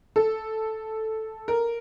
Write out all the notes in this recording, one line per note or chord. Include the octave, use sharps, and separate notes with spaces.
A4
A#4